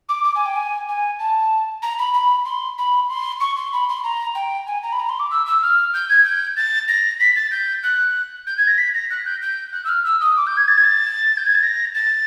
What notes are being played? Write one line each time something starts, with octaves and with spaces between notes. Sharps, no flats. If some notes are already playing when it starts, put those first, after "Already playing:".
D6
D6
G#5
G5
G#5
G#5
A5
A#5
B5
B5
C6
B5
C6
C#6
C6
B5
C6
A#5
G5
G#5
A#5
B5
A#5
C6
D6
E6
E6
F6
G6
G#6
G6
A6
A#6
B6
A6
G6
F#6
G6
G#6
A#6
B6
A#6
F#6
G6
G6
F#6
E6
F6
E6
D#6
D6
G6
G#6
A6
G#6
A6
G6
G#6
A6
A#6
A6